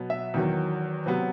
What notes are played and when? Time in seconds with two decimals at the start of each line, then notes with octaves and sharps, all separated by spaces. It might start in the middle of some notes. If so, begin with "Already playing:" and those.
Already playing: B2 F#3 B3
0.10 E5
0.34 E2 D#3 F#3
1.06 C3 F#3 B3